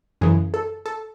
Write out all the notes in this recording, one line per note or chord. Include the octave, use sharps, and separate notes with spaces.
F#2 C#3 E3 G#4
A4
A4